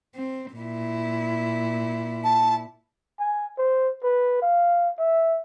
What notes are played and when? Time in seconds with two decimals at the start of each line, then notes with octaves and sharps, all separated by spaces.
0.15 C4
0.56 A#2 E4
2.24 A5
3.20 G#5
3.59 C5
4.04 B4
4.42 F5
4.99 E5